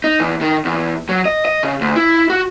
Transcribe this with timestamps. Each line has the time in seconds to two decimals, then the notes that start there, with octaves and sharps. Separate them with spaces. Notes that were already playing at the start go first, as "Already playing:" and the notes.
0.04 D#4
0.20 E2
0.41 D#3
0.65 E2
1.09 F#3
1.26 D#5
1.45 D#5
1.63 C#3
1.81 D2
1.96 E4
2.30 F#4